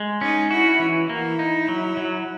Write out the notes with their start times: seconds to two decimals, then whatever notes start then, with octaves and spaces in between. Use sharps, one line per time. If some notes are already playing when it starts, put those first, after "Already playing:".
Already playing: G#3
0.21 C#4 D#4
0.51 E4 F#4
0.79 E3
1.10 A#3 E4
1.39 D#4
1.68 F#3
1.97 F#3